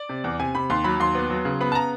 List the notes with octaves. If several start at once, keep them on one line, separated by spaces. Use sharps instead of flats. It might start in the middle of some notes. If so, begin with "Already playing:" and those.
Already playing: D5
C3
E2
C3 G#5
C3 B5
D#2 C6
F#3 B5
D#2 C6
B3
F#3
C#3
B3 B5
A5
C#3 A#5